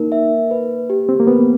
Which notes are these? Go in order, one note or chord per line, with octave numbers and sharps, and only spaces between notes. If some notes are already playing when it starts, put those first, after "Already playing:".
Already playing: A#3 D#4 A#4
E5
B4
G4
C4
A#3
B3 B4